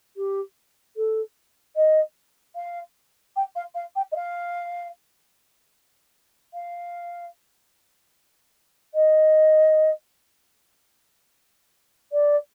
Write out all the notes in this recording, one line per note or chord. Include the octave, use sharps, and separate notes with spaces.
G4
A4
D#5
F5
G5
F5
F5
G5
D#5
F5
F5
D#5
D5